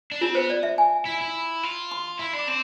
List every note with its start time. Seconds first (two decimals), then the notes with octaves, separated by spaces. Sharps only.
0.12 D4
0.21 C4 F4
0.35 B3 C5
0.50 D5
0.63 E5
0.78 G#5
1.05 E4
1.21 E4
1.63 F4
1.91 C6
2.19 E4 C6
2.33 D4
2.39 D6
2.47 C4 C6